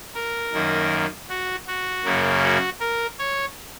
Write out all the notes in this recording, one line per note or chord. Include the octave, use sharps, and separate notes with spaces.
A#4
F#2 D#3 A#3
F#4
F#4
F#2 C#3 A#3
F#4
A#4
C#5